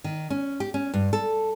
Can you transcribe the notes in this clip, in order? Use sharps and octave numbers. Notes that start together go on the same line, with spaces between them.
D#3
C#4
G4
C#4
G2
A4